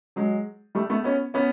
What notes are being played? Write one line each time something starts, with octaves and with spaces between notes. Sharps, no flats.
F#3 G#3
G3 A3
A3 B3
B3 C#4
B3 C#4